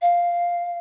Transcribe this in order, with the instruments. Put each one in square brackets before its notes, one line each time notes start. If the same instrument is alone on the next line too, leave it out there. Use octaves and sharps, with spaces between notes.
[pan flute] F5